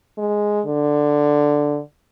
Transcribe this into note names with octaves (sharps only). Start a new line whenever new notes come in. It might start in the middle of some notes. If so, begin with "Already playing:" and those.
G#3
D3